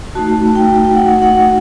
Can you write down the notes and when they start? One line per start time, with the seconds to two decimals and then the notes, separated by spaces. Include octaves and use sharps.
0.15 A3 D#4 F#4 A5
0.55 G5
0.85 G5
0.95 F#5
1.22 F#5